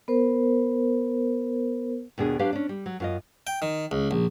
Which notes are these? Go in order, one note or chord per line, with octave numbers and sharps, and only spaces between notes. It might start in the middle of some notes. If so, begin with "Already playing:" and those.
B3 A#4 C5
D#2 B2 D4 G#4
F#3 D4 G4 B4 F5
C#4 D4
G3
F#3
F#2 F4 D#5
G5
D#3
C#2
A#1